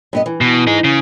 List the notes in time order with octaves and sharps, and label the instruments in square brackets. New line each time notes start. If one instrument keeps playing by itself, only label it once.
[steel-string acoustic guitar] G2 B3 D#5
E3
[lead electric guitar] B2
D#4 G#4
C#3